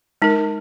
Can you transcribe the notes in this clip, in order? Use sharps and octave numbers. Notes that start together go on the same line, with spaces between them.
G#3 D#4 A#4